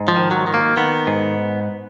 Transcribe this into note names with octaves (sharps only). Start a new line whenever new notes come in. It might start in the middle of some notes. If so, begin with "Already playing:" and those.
Already playing: G#2
F3
D#3
F#3
D#3
A#3
D#3 B3
G#2